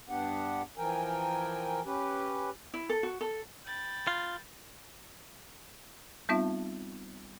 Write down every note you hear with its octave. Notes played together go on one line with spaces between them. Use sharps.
G2 B3 D4 G4 F#5
E3 F3 A#4 G5 G#5
C#4 G4 B4
E4
A4
F#4
A4
G5 B5 A6
F4
G3 B3 C4 D#4 F4 E5